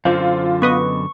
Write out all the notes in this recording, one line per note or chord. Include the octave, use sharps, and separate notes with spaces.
F#2 D3 C4 F4 C5
B3 B4 D#5 C#6